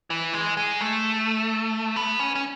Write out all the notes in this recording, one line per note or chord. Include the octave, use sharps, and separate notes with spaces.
E3
G#3
G#3
A3
B3
C#4
C#4